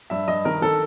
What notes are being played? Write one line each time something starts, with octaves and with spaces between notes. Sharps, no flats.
G2 E5
G2 D#5
D#3 A#4
D#3 A4